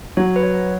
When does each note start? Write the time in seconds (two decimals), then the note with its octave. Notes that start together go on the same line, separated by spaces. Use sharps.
0.17 F#3 C#5
0.36 B4
0.43 C#5